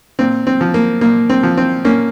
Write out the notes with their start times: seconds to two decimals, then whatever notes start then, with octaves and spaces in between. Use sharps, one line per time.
0.19 A#2 C4
0.47 C4
0.61 F3
0.74 A#3
1.01 A#2 A#3
1.30 C4
1.43 F3
1.57 C4
1.85 A#2 A#3 C#4